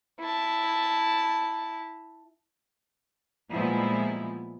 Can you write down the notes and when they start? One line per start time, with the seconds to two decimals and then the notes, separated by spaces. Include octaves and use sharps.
0.20 E4 A5
3.52 A#2 F3 G3 G#3 B3 E4